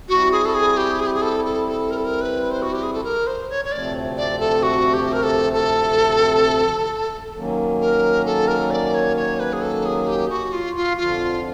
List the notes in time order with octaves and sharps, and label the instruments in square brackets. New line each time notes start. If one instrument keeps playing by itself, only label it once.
[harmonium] G3 C4 E4 [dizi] F#4
[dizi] G#4
A4
G#4
G4
G#4
G4
G#4
A4
A4
A4
A#4
A4
A#4
B4
C5
F#4
G4
G#4
A4
A#4
C5
C#5
C#5
[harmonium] D2 C3 F3 A3 C4 [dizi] D5
[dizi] D5
A4
F#4
G4
A#4
A4
A4
[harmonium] D#3 F#3 A#3 C#4
[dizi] A#4
A4
A#4
D5
C#5
C#5
B4
G#4
A4
G#4
G4
F#4
F4
F4
[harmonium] F2 D3 F3 [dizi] F4